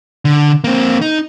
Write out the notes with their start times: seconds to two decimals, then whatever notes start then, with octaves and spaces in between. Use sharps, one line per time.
0.25 D3
0.64 A#3 C4
1.01 D#4